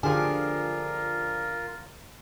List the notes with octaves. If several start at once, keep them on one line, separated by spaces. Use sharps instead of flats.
D3 F3 D4 F4 G4 G#4 A#4 G#5